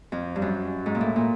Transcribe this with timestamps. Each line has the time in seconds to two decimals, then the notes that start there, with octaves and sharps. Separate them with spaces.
0.12 F2
0.36 G2
0.42 F#2
0.86 G#2
0.95 A#2
1.01 A2
1.16 A#2